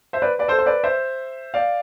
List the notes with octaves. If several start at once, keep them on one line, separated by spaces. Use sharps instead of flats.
C5 E5
B4 D5
B4 D5
A4 C5
C5
B4 D5
C5 E5
D5 F5